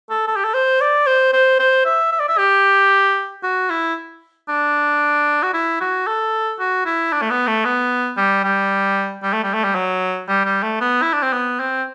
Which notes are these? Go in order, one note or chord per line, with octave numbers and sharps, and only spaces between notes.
A4
A4
G4
A4
C5
D5
C5
C5
C5
E5
E5
D5
E5
G4
F#4
E4
D4
F#4
E4
F#4
A4
F#4
E4
D4
A3
B3
A3
B3
G3
G3
G3
A3
G3
A3
G3
F#3
G3
G3
A3
B3
E4
D4
C4
B3
C4